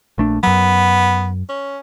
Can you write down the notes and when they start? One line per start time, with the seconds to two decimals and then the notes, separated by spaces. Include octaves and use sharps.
0.18 A#1 A3 D4
0.43 F#2 F#3 B3
1.49 C#4